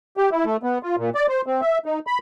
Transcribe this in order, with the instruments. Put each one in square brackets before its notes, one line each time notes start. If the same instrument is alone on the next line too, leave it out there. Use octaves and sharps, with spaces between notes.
[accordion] G4
E4
A3
B3
F4
A#2
D5
C5
C4
E5
D#4
B5